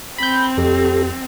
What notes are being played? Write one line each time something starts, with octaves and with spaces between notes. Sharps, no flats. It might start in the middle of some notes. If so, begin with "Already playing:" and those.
C4 B5 G6
F2 G4 A4